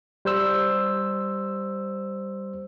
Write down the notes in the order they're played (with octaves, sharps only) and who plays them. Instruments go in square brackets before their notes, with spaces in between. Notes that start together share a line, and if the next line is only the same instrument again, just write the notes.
[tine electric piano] G3 C5 E6